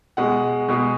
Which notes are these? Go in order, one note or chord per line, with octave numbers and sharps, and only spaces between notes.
B2 G#3 F#5
B2 G#3